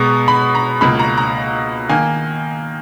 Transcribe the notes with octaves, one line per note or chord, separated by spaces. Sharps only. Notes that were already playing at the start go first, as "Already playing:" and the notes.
Already playing: B2 G#3 B3 A#5
B5
A#5
C#2 B2 A#3 B5
A#5
A#5
D#3 A#3 G#5